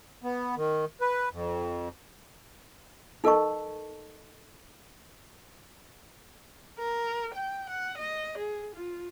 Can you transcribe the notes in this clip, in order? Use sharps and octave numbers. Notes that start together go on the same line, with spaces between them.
B3
D#3
B4
F2
D#4 A4 A#4 D#5 A5 C#6
A#4
G5
F#5
D#5
G#4
F4